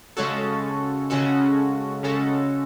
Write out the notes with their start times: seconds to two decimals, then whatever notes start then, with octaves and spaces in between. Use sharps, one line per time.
0.17 C#3 G#3 C#4 F#4 A4
1.10 C#3 G#3 C#4 F#4 A4
2.03 C#3 G#3 C#4 F#4 A4